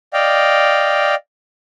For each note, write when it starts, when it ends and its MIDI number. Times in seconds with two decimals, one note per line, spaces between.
0.13 1.15 74
0.13 1.15 75
0.13 1.15 77
0.13 1.15 79